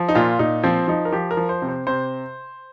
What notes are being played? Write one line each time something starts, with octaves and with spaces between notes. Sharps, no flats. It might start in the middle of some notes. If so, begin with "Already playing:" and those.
Already playing: F3
D#4
A#2 F4
A#2 D#4
F3 C4
F3 D#4
A#4
F3 G4
A#4
F3
C5
C3
C5
C3 C5